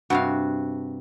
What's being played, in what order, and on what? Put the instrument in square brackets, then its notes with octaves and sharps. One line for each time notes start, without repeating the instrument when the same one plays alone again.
[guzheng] G2 C3 F5 [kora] F#4